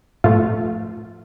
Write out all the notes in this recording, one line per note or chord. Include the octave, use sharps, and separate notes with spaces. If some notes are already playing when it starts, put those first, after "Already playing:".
A2 F3 A3 F4